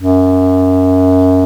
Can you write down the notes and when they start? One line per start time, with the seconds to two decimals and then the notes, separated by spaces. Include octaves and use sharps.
0.01 F#2